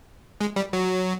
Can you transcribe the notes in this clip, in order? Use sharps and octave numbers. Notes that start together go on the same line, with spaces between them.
G#3
G3
F#3